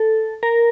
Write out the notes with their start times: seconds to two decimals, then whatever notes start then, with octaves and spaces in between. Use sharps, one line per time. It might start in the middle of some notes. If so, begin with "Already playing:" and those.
Already playing: A4
0.43 A#4